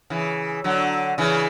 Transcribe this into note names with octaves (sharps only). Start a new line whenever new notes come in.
C#3 E3
D3 F#3
C#3 E3